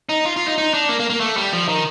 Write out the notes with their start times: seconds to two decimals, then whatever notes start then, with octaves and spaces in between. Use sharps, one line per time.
0.09 D#4
0.26 F4
0.36 F4
0.46 D#4
0.58 D#4
0.74 D4
0.89 A#3
1.00 A#3
1.10 A#3
1.20 A3
1.37 G3
1.53 F3
1.68 D#3